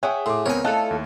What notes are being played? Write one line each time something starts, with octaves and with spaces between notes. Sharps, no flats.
G#4 C#5 E5 F#5 G5
A2 C6 D6
C#2 B3 C4 A#4 C#5 G#5
A3 E4 F4 A4 D#5 A5 F#6
D#2